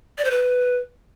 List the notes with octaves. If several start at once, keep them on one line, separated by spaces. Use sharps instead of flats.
D5
C5
B4